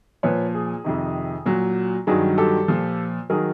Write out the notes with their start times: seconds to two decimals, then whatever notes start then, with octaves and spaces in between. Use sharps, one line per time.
0.23 A#2 F3 B4 C#5
0.54 G#4
0.84 F2 C3 D#3
1.46 A#2 F#3
2.07 G2 D#3 F#3 G#4
2.38 G4 A4
2.68 A#2 F3
3.30 D#3 F#3 G#4 A#4